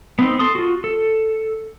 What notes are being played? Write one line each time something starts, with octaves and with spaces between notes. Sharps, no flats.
B3 C4 D#4
A4 C6 D#6
F4 F#4
A4